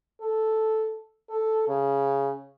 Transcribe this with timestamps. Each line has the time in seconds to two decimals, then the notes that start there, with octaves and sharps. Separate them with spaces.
0.21 A4
1.30 A4
1.68 C#3